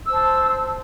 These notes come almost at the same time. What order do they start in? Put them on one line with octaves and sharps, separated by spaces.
E6 C5 A5